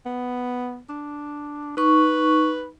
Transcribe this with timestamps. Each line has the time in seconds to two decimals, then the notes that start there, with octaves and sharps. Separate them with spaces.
0.06 B3
0.89 D4
1.77 D#4 B4 C#6